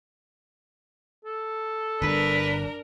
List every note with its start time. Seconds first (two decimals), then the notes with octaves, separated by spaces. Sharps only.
1.25 A4
2.02 G1 G2 D4 A#4 B4